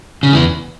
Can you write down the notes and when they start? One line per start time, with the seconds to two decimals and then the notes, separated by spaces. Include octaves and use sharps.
0.23 C#3
0.33 E2 E3